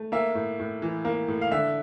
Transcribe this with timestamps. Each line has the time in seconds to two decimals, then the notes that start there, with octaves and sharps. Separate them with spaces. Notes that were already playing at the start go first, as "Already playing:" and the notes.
Already playing: A3
0.12 A#3 E5
0.35 A2
0.60 A2
0.82 E3
1.05 A#3
1.28 A2
1.41 F5
1.52 D3 E5